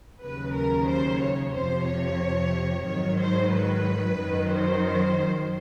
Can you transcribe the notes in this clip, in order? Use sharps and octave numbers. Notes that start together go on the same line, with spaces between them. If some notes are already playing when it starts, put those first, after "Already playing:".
D#2 C#3 F#3 B4
A#4
C5
C#5
F2 C3 F3 C5
C#5
G#2 D#3 F#3 C#5
C5
B4
F#2 D#3 F#3
C5